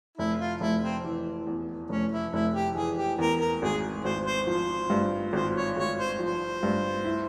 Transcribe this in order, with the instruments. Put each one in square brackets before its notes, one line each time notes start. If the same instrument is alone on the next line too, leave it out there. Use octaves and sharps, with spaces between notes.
[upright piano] F1 [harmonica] E4
[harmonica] F4
[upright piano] F1 [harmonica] E4
[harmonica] C4
[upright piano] E3
E2
[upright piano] F1 [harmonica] C#4
[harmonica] E4
[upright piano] F1 [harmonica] E4
[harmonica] G4
[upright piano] E3 [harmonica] G#4
[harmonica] G4
[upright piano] E2 [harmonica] A#4
[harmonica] A#4
[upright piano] G#1 [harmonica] G#4
[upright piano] G#1 [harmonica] C5
[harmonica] C5
[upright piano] F3 [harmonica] C5
[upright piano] G2
[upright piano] G#1 [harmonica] C5
[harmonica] C#5
[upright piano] G#1 [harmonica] C#5
[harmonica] C5
[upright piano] F3 [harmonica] C5
[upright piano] G2
E4